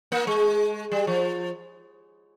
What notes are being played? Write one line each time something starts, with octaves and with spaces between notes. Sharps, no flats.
A#3
G#3
G3
F3